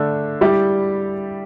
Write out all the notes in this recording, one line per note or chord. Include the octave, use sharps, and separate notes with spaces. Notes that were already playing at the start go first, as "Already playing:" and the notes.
Already playing: D3 A3 D4
G3 E4 G4 D5